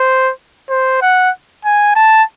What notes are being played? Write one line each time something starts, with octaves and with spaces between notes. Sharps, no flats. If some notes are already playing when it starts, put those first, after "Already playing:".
Already playing: C5
C5
F#5
G#5
A5